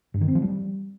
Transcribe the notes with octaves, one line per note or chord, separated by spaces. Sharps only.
G2
D#3
C4
F3
G3